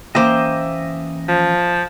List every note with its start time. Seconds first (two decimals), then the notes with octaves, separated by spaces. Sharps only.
0.15 E3 A#3 C#4 C5 D#5 E5 G5 D6
1.29 F3